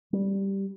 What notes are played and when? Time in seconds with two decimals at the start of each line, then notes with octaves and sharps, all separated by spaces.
0.13 G3